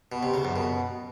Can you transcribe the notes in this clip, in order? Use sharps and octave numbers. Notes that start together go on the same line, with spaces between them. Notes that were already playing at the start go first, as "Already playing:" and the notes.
B2
C3
C#3
F#2
B2